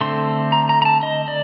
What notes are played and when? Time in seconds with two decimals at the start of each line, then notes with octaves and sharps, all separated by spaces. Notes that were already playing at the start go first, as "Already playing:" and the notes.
0.01 D3 A3 C4 C6
0.52 A#5
0.69 A#5
0.82 A#5
0.85 A5
1.03 D#5
1.28 D5